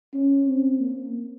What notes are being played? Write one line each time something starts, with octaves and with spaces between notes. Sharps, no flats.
C#4
C4
A#3